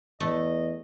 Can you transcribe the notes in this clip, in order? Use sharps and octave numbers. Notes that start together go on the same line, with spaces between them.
E2 A3 D#5